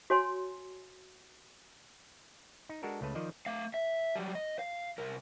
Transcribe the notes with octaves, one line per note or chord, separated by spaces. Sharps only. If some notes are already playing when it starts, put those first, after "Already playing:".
F#4 C#5 G#5 C6
D#4
G#3 D4 F#4 A4 A#4
C#2 C#3 A3 B4 A5
D#3 F3 C5 D5 D#5
A3 F5
E5
F#3 G3
D#5
F5
C2 A#4